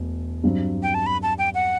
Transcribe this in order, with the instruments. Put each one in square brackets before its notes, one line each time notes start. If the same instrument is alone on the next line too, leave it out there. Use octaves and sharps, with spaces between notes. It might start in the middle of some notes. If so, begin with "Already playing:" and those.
Already playing: [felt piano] E1 A3
G2 F#3 C4
[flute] G5
A5
B5
A5
G5
F#5